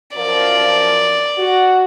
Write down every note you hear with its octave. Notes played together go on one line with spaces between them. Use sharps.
F#2 F3 A#4 D5
F#4